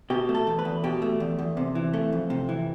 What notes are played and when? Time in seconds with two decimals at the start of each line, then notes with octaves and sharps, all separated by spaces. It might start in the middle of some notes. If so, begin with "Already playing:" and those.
0.10 B2 G4
0.29 A3
0.35 A4
0.47 E2
0.59 B4
0.65 E2
0.84 B2 G4
1.02 A3
1.20 E2
1.39 E2
1.57 C3
1.75 E3
1.94 A3
2.12 F2
2.30 C3
2.49 E3